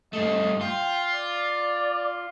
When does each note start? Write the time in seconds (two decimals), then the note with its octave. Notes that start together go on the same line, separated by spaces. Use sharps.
0.13 G2 A3 D#5
0.61 F4 G5
1.13 D5